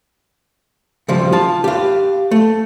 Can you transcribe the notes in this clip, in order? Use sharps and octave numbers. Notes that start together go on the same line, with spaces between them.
C#3 F3 G3
F4 A5
G4 F5
A3